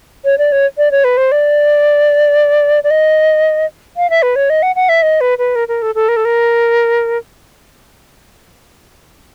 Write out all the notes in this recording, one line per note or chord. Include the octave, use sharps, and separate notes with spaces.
C#5
D5
C#5
D5
C#5
B4
C5
D5
D5
D#5
F5
E5
B4
C#5
D#5
F#5
F#5
E5
D#5
B4
B4
A#4
A#4
A4
A4
A#4
A4
A#4